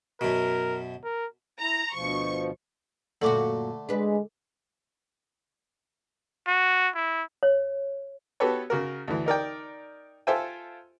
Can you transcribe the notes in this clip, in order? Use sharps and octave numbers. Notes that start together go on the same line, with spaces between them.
F#2 B2 A#4
A#4
E4 A#5
D2 B2 F3 C#6
F#2 A#2 D3 A3 F#4 A4 C#6 D6
G#3 D4 B4
F#4
E4
C#5
B3 F#4 G4 A4 B4 C#5
C#3 F#4 A#4
D2 E3
D#4 A#4 D5 G5
F4 A4 C5 E5 G5 G#5